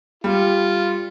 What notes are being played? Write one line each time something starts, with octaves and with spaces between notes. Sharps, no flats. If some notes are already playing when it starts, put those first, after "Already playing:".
G3 F4